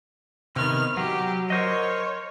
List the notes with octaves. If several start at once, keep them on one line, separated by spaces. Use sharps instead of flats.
C3 D#3 B3 F6
F#3 G4
A#4 C5 C#5 D#5